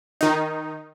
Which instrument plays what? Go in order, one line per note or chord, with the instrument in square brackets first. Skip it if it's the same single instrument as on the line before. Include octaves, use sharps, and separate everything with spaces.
[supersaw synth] D#3 D#4